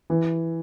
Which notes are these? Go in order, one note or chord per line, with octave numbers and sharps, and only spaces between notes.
E3